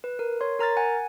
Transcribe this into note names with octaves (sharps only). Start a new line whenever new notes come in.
B4
A#4
C#5 C6
A#4 A#5 F6 A6
F#5 G#5